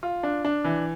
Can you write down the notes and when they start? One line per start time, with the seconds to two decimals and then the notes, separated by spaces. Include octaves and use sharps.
0.03 F4
0.23 D4
0.45 D4
0.64 E3